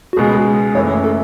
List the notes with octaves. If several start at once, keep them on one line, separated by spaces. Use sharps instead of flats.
F#4
C#2 B2 G#3 G#4
F#1 F#2 E3 A3 C#5
A4